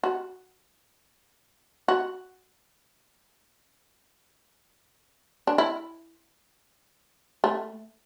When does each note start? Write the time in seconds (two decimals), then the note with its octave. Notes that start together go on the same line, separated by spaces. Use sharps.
0.03 F#4
1.88 F#4
5.47 D4
5.58 E4
7.44 A3